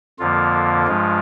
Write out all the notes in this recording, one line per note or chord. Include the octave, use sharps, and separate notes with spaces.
F2 D3 F3 A#3 F4
G2 F3 G#3